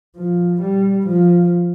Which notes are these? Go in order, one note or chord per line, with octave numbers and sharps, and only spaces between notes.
F3
G3
F3